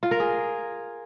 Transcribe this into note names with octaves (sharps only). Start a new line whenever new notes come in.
F4
A#4
G#4